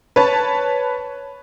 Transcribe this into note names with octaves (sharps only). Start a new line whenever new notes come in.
B4 C#5 A5